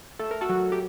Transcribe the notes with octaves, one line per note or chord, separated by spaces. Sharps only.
A3 A4
A#4
F#4 A4
F#3
G4